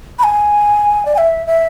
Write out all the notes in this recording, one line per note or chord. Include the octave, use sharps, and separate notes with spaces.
B5
G#5
D5
G#5
E5
E5